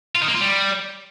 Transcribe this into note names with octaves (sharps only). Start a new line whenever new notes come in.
F4
D#3
A#3
F4
G3